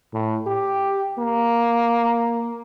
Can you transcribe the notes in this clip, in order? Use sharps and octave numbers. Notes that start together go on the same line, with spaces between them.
A2
G4
A#3